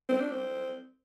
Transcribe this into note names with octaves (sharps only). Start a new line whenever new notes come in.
C4
D4
C4